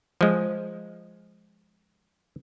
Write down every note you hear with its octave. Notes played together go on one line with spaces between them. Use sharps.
F3 G#3